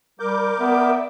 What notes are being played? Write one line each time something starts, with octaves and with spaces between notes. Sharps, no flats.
G3 A#4 D6 G6
B3 D5 E5